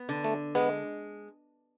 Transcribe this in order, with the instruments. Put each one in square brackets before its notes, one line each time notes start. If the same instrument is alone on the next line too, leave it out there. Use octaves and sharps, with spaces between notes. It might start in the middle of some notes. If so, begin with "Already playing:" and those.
Already playing: [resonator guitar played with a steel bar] B3
D3
[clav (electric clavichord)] A3
[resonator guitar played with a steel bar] G#3 [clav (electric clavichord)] B3